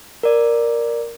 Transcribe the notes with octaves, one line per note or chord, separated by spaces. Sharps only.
A#4 D5